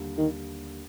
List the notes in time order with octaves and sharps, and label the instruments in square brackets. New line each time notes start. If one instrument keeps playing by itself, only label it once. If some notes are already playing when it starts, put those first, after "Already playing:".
Already playing: [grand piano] D#2 D3 G3
[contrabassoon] D#3